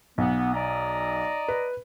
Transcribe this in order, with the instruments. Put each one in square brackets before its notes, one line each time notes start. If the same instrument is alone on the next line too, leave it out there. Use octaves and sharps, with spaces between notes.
[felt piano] B1 [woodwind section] B3
[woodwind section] D5 D#5 A#5
[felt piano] B4